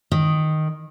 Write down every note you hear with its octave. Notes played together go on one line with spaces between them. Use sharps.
D#3